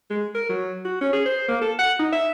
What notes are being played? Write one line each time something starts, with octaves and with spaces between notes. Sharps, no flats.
G#3
A#4
F#3
F#4
C#4
G#4
C5
A#3
A4
F#5
D#4
E5